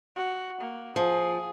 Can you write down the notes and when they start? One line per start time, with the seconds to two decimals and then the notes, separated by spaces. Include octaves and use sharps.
0.16 F#4
0.61 A#3
0.96 F3 G#4